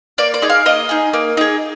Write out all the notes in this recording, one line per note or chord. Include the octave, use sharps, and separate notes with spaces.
A#3 D5
D5
D#4 G#4
F5
A#3 D#5
D#4 G#4
A#3
D#4 G#4